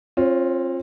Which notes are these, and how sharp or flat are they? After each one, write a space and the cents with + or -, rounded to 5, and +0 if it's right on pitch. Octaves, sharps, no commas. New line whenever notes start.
C4 +35 F4 +0 C#5 +0